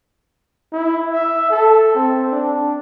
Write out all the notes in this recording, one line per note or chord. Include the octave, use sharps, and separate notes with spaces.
E4
E5
A4
C4
D4